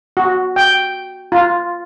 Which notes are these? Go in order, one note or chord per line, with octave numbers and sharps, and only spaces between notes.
F#4
G5
F4